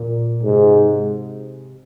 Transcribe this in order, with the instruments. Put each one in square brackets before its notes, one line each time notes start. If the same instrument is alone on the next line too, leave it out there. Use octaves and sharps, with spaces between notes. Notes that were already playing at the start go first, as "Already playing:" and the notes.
Already playing: [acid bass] A#2
[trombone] G#2 [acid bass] C3